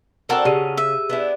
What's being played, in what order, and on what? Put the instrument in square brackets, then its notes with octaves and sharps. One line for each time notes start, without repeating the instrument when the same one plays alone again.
[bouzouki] C4 D4 A5 [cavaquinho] F#4 A4 A#4
[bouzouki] C#3 [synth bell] G4 G#4 D#7
[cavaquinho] E5
[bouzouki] B3 D4 E4